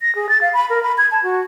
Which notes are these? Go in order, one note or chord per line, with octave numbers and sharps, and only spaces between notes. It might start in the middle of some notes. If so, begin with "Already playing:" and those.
A#6
G#4
A6
F5
B5
A#4
B5
G#6
A5
F#4